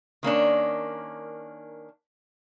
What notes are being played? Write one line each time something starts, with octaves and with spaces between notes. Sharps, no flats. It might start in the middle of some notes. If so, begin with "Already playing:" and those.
D#3 A#3 C#4 D4